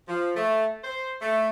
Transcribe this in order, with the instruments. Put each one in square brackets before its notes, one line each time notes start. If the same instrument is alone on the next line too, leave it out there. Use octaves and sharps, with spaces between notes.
[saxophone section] F3
A3
C5
A3